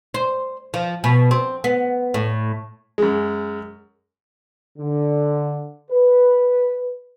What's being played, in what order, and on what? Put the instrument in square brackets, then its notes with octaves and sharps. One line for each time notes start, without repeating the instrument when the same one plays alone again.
[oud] C5
F3
B2
C4
B3
A2
[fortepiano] F#2 G#3
[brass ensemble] D3
B4